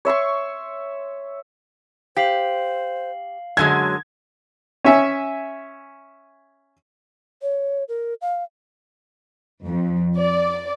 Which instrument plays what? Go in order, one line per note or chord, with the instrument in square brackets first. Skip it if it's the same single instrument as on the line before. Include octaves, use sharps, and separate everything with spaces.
[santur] C#5 E5 C6 C#6
[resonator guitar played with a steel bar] G4 [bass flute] C5 [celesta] F5 C7 F#7
[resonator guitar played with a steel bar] F#2 D3 G#3 [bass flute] F#3 [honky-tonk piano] G#6
[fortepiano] C#4 E5 G#5
[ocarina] C#5
A#4
F5
[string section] F2
D5